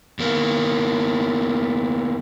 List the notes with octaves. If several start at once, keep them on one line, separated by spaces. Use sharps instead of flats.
E2 A#3